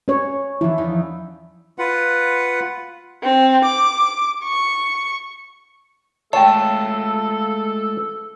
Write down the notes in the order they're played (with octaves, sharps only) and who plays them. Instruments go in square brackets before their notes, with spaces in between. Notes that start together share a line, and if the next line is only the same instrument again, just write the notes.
[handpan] C#4 C#5
[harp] E3 F3 [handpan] E4
[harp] E2 D#4
[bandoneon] F4 B4 F#5
[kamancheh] C4
D6
C#6
[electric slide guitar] G#3 A3 F4 [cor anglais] A4 [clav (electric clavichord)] C#5 G5 [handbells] A5